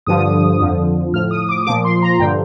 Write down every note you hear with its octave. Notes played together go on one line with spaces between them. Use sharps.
G2 D3 F3 D#6
F2 D3 F3
A2 F3 F6
D#6
D6
A#2 F3 D6
C6
A#5
G2 D3 F3 G5